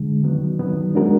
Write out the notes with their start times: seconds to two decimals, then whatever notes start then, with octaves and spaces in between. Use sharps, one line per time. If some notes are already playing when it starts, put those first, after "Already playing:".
Already playing: D3 G#3
0.23 D#3 F#3 B3
0.59 D#3 F#3 B3
0.95 G#3 D4 F#4 A#4